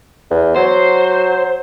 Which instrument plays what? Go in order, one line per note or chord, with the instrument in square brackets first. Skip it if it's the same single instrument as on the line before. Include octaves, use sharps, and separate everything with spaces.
[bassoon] E2
[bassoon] F#3 [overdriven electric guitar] C5